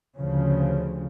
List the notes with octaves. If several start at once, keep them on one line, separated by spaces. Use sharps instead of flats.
D2 C#3 F3